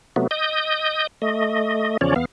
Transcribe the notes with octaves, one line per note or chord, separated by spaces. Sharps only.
C3 F#3 A3 B3
D#5 D#6 G6
A3 D#5
E2 C#3 F3 C#4 C#5 D5
E2 B3 F5